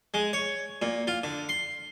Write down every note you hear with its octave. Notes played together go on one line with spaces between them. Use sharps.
G#3
C#5
A#2
F4
D3
C6